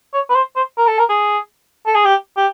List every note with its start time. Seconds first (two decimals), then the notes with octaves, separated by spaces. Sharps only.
0.14 C#5
0.30 B4
0.35 C5
0.56 C5
0.78 A#4
0.87 A4
0.99 A#4
1.09 G#4
1.87 A4
1.95 G#4
2.05 G4
2.37 G4